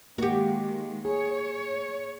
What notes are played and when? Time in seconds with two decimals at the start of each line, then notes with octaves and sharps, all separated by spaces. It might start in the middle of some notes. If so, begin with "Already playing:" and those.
0.18 D#3 G#3 A#3 F#4 G4
1.05 G#4 C#5